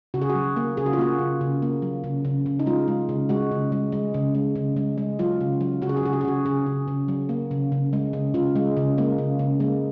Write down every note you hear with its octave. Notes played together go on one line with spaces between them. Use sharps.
C#3 F#4
G#4
F#4
F#3
A#3
C#3 G#4
F#4
F4
A#3 F#4
C#3
C#3
A#3
F#3
C#3
C#3
C#3
D#4
G#3 F4
G#3
C#3
G#3 F#4
C#3
G#3
G#3
C#3
G#3
C#3
G#3
G#3
F#3 F4
C#3
F#3
C#3 F#4
G#4
F#4
C#3 G#4
F#4
G#4
C#3 F#4
C#3 G#4
C#3
C#3
F#3
A#3
C#3
C#3
G#3
C#3
C#3 F4
G#3
C#3
G#3 A#3
C#3
C#3
G#3 A#3